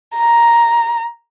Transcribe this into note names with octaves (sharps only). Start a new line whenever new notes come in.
A#5